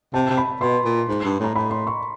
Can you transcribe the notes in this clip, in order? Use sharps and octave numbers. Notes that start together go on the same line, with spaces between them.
C3 A5
C3
B5
B2 C6
A#2
G#2
G2
A2 A#5
A2 B5
C6
C#6